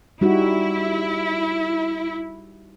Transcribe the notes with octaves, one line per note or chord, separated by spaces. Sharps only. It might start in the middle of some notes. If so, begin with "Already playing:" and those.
G3 D#4 E4 F#4